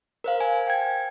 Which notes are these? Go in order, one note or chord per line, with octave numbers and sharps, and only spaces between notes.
A#4 C5 F5
G#5
G5 G#6